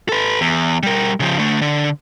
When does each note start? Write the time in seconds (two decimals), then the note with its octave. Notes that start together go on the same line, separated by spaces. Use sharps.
0.09 A4 B4
0.41 E2
0.83 G3 A#4
1.20 C#3 F3
1.38 D3 A3
1.61 D3